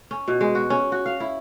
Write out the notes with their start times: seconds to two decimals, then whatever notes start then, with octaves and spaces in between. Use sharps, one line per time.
0.11 C#4
0.28 B2
0.41 G#3
0.55 F#4
0.70 C#4
0.92 F#4
1.06 F5
1.20 E4